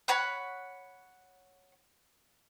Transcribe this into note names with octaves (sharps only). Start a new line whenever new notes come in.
C#5 F#5 B5 F#6